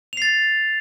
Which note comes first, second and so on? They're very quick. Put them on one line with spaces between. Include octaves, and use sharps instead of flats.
F7 C7 A6